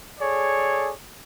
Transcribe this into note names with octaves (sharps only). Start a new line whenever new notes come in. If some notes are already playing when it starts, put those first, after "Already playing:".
G#4 A4 C#5 D5